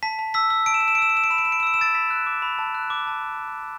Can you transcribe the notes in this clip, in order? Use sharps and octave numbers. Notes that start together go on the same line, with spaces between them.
A5 B6
A5
E6 B6
E6
A5 D7
E7
A5 D7
E7
D7
E6 E7
D7
E6 E7
D7
B5 E7
D7
B5 E7
D7
E7
E6 D7
E7
E6 A6 D7
B5 B6
F#6
D6
B5
A5
F#6
D6
A5